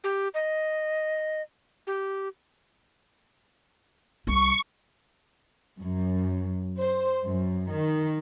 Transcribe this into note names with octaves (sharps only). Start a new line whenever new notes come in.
G4
D#5
G4
C2 G3 C#6
F#2
C5
F#2
D#3